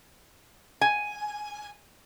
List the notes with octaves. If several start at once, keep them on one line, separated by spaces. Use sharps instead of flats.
G#5